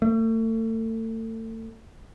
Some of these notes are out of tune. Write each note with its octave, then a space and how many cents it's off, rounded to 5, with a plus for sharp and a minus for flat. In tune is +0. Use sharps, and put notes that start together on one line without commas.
A3 +35